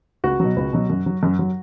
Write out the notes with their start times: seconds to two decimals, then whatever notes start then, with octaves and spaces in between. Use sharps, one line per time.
0.24 C#2 F#4
0.40 B2 F#3
0.56 C#2
0.73 B2 F#3
0.90 F#2
1.06 F#3
1.23 F#2
1.39 F#3